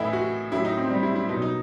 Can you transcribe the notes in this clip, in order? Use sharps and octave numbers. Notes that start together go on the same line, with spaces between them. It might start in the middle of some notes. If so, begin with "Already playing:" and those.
Already playing: A2 E3 D#4 E4
F#4
A2 F#3 E4
D#4
C4
G3
E4
E4
B2 F#3 D#4
D#4